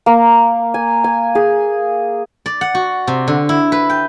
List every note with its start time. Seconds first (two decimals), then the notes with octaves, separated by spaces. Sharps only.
0.06 A#3
0.74 G#5
1.04 G#5
1.35 G#4
2.46 D5
2.61 F#5
2.75 F#4
3.07 C3
3.28 D3
3.49 E4
3.72 B4
3.90 G5